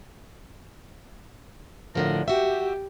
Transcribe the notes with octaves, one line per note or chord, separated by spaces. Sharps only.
A2 D3 F3 A#4
F#4 G4 E5